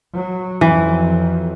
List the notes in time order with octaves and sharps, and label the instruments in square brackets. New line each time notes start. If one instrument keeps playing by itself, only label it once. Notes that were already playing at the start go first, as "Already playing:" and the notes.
[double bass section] F#3
[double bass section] F2 F#3 [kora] E3